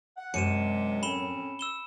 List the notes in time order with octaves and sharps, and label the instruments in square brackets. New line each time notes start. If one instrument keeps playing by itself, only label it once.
[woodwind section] F#5
[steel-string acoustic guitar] F#2 [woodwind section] C3 G#3 [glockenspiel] C#7 D#7 E7
[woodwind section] A2 C4 C#4 [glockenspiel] B5 E7 G7
[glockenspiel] E6 E7 G7